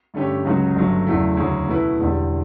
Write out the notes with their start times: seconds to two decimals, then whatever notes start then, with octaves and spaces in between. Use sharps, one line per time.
0.14 G2 D3 A3 C#4 G4
0.45 C#2 C#3 F#3 C#4 F#4
0.76 G1 G2 F#3 A3
1.07 E2 C#3 F#3 A3 E4
1.37 D2 C#3 F#3 C#4
1.68 B2 A3 E4 B4
1.99 E1 E2 D3 G3